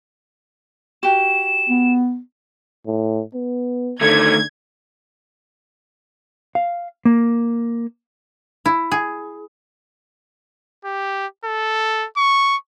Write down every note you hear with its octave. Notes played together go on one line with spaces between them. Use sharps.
F#4 G4 E7
B3
A2
B3
D3 D#3 A3 G#6
F5
A#3
E4
G#4
G4
A4
C#6